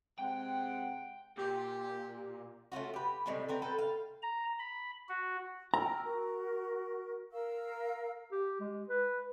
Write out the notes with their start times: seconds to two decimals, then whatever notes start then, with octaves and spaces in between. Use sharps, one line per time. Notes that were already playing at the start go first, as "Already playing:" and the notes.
0.19 C3 G#3 F#5 G5
1.37 A#2 G4
2.72 A3 C#4 F4 F#4
2.94 G4 B4
3.26 A2 C3 G3 G#3
3.49 C4 A#4 B4
3.62 A4 B4 C5 G5
3.79 F5
4.23 A#5
4.59 B5
5.09 F#4
5.74 G5 A#5 E6 F6
6.05 F#4 A#4
7.33 A#4 F5 E6
8.32 G4
8.60 G#3
8.89 B4